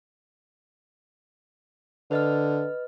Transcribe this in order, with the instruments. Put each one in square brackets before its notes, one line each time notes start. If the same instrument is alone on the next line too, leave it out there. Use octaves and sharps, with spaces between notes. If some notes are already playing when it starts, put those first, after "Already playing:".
[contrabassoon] D3 [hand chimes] B4 D#5 F6